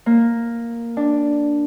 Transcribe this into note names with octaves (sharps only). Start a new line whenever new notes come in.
A#3
D4